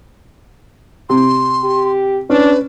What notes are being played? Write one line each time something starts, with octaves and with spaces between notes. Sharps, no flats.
C3 C6
G4
C#4 D4 B4